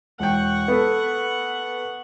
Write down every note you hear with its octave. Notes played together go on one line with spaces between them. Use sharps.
E1 F#5 G5 C#6
B3 A4 B4